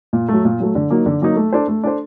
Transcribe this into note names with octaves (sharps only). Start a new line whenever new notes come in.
A#2
F#3 A3
A#2
F#3 A3
D3
F#3 A#3 D#4
D3
F#3 A#3 D#4
A3
D4 A4 C5
A3
D4 A4 C5